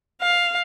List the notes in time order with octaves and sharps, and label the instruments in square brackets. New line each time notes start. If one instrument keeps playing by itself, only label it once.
[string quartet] F5